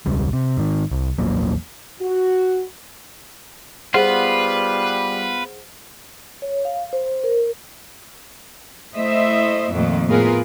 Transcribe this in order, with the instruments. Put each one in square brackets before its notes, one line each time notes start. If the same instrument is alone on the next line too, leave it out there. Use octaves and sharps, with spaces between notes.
[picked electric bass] E1 C#2 G3
C3
G#2 D#3
C2
A#1 E2 F#3 A#3
[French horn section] F#4
[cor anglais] G3 [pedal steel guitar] B3 F4 [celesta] G#4 C5 F#5 [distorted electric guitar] B4
[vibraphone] C#5
F5
C5
A#4
[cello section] A3 E4 C5 D#5 E5
F2 A#2 D#3 A3
A2 B3 F4 G#4 A#4 B4